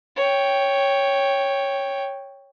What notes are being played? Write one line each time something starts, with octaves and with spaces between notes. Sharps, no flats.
C#5 G5